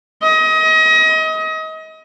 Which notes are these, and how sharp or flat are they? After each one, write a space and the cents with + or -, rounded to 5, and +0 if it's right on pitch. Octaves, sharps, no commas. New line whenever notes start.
D#5 +30